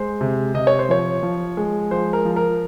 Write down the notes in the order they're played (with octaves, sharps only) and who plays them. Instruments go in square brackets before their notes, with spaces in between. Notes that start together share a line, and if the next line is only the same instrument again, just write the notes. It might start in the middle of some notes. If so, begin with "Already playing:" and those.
Already playing: [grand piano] G#3 C5
C3
C3 D#5
C#5
C5
F3 C#5
F3
G#3
F3 C5
A#4
F3
A#4